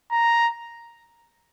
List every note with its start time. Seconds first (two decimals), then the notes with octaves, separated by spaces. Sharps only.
0.12 A#5